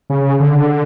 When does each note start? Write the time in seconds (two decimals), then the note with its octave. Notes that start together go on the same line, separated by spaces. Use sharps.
0.10 C#3
0.40 D3